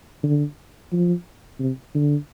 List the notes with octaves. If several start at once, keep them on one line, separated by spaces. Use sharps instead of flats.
D3
F3
C3
D3